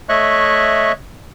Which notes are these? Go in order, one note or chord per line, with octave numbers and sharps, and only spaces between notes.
A3 C#5 D#5 E5 C#6 F#6